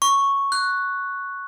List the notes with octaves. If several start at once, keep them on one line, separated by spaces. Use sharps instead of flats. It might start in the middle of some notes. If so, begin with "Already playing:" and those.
C#6
F#6